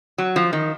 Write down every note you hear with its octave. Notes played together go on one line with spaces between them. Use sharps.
F#3
F3
D#3